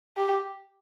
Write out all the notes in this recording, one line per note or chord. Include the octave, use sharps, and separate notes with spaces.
G4